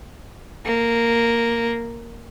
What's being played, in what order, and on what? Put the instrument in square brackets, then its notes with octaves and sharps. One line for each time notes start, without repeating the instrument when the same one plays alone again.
[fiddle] A#3